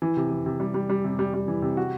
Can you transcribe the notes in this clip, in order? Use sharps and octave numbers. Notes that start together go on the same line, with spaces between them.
E3
C3
E3
C3
G3
G3
G3
C3
G3
G3
E3
C3
F#4